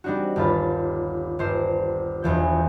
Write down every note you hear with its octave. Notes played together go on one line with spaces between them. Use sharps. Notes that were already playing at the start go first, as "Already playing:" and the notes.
G3 C4 D4 D#4 F#4
G1 D#2 F4 B5 A6
G1 C5
E1 E2 F3 G6